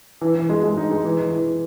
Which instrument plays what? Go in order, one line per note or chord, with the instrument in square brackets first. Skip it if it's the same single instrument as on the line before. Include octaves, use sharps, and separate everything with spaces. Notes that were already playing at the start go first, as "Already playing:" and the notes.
[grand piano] E3
E3
G#3
G#3
D#4
G#3
E3
E3
E3